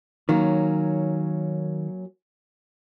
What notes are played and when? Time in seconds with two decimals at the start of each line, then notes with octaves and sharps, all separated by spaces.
0.29 D#3 F#3 A#3 C#4